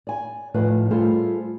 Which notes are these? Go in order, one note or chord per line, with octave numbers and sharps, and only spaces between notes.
D5 G#5
A2 D#3 F3 B4 D5
G3 A3 F4 G#4 A4 C5